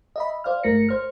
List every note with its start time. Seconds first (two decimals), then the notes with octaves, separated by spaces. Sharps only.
0.16 D#5 E5 B5
0.44 C5 D5 F5 F6
0.63 G1 A3 A#4 A#6 C#7
0.89 C5 F6